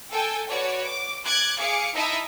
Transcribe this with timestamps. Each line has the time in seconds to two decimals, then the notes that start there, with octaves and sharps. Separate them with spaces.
0.12 A4 G5 G#5
0.49 F#4 B4 C#5 D5
0.86 D6
1.25 D6 F#6 G#6 A6
1.58 G#4 F5 D6 C#7
1.94 D#4 E4 E5 A5 D#6